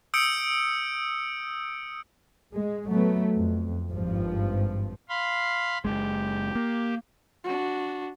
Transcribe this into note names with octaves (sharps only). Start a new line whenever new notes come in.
D#6 E6 G6 C#7 D7
G#3
F#3 A3 B3
F2
G#1 G2 F3
F5 B5 C6
F#1 D#2 G#3 G4
A#3
D4 F#4